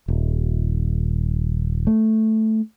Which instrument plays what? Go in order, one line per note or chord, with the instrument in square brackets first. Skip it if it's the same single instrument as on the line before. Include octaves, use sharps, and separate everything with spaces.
[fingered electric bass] D#1
A3